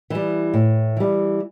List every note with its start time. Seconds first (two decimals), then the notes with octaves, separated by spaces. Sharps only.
0.10 E3 G3
0.54 A2
0.96 E3 G3